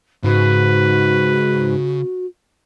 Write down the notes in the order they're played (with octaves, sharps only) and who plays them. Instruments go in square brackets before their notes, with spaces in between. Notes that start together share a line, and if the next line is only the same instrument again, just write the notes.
[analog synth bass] G#2 [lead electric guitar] C#3 [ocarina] F#4 [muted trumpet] B4